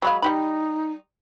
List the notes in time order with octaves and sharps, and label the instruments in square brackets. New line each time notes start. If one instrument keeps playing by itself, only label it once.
[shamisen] F#3 G#3 F5 [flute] B5
[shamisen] G3 G4 B5 [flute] D#4